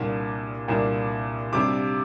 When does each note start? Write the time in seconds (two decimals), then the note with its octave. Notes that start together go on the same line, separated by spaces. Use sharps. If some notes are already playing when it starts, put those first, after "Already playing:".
Already playing: C2 A#2 A#3 D4
0.68 C2 A#2 A#3 D4
1.53 C3 G3 D4 D6